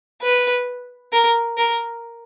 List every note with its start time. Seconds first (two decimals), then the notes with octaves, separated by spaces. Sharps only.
0.22 B4
1.12 A#4
1.57 A#4